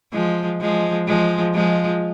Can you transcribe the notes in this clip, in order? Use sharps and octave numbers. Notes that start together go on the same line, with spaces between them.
F3 G#3
F3 G#3
F3 G#3
F3 G#3